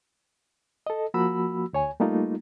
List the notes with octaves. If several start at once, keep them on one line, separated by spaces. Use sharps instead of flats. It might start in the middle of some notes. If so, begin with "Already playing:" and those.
A4 D#5
F3 A#3 F#4 B5 E6
D2 C#5 G#5
G3 A3 A#3 D#4 F4